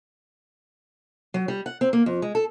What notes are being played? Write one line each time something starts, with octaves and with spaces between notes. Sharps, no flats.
F#3
G3
F#5
C4
A#3
F2
G#3
A4